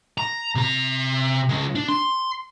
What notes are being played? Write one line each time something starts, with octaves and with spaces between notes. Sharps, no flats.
A#5
C3 A#5
G#3 C#4
D4
C6